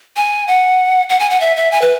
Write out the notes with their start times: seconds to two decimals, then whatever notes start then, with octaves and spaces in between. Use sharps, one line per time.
0.16 G#5
0.48 F#5
1.09 F#5
1.20 G#5
1.30 F#5
1.40 E5
1.56 E5
1.72 G#5
1.82 B4